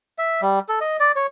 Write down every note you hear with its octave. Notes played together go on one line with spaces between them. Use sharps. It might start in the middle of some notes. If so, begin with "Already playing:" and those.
E5
G3
A4
D#5
D5
C#5